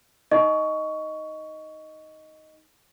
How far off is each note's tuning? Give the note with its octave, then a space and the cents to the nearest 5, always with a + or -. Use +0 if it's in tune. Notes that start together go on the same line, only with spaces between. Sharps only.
D#4 +10 D#5 +0 C#6 +15